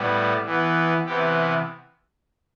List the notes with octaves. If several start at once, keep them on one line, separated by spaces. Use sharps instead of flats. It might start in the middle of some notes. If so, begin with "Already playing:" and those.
Already playing: A2 G3 B3
E3 B3
C3 E3 B3 G4